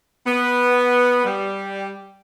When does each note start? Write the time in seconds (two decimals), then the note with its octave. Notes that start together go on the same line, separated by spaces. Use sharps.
0.26 B3
1.25 G3